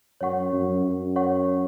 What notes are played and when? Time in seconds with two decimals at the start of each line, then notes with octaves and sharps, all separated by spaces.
0.21 F#2 C#5 F#5 C#6
0.53 F#2
0.85 F#2
1.16 C#5 F#5 C#6